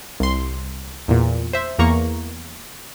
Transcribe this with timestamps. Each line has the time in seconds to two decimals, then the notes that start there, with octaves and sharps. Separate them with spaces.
0.20 C2 C6
1.08 E2 A#2
1.53 C5 E5
1.79 E2 A#3 A#5 C#6